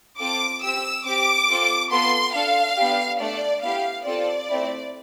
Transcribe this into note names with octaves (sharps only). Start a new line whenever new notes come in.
C4 F4 A4 D6
C4 G4 E6
C4 G4 D6
C4 F4 A4
B3 F4 A4 C6
D4 A4 F5
B3 D4 G4
A3 D4 A4 D5
B3 E4 G4 F5
C4 F4 A4 D5
A3 C4 E4